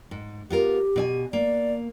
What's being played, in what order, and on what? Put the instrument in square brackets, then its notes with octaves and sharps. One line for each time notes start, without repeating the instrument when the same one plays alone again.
[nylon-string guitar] G#2
[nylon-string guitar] B3 F4 A#4 [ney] G4
[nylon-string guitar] B2 D5 G#5
[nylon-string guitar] A#3 [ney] D5